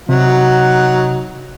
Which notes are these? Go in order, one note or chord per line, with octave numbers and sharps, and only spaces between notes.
C3 F#3 D#4 F#5